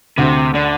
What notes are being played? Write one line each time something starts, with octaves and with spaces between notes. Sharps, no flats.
D2 C3
D3 D4